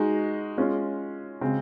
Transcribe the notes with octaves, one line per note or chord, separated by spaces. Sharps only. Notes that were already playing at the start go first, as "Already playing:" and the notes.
Already playing: G#3 D#4 F#4
G#3 C#4 F4
C#3 G#3 C4